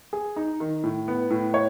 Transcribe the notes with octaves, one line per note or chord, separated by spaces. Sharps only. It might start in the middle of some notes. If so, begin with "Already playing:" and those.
G#4
D#4
D#3
A2
B3
A2
C#5